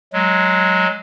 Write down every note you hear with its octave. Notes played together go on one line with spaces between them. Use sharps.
F#3 G#3